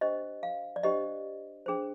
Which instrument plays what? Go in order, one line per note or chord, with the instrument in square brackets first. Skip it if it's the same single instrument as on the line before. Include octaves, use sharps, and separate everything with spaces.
[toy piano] D4 G4 C5 D#5
F5
D5
D4 G4 C5 D#5
D4 G#4 C5